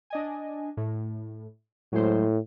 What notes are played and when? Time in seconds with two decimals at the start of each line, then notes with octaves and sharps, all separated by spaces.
0.10 D4 D#5 G#5
0.77 A2
1.93 A2 F#3 G#3 C5